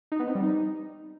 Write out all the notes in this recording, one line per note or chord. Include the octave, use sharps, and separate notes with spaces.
D#4
B3
C4
G3
D#4